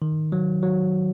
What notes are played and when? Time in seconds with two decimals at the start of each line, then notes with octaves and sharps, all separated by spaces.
0.02 D#3
0.32 F#3
0.63 F#3